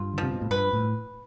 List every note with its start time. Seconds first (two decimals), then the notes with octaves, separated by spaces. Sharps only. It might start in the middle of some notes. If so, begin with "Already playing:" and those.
Already playing: G2 F4
0.13 D3
0.18 F3
0.23 C3
0.32 B2
0.42 A2
0.51 G2 B4
0.73 A2